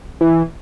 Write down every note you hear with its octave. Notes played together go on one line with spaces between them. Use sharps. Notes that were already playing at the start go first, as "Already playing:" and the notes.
E3